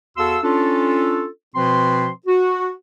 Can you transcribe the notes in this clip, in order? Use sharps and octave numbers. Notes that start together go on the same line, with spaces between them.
E2 F#4 A4 F5 C6 E6
C#4 D4 F4 A4
B2 F3 C4 B4 C6
F#4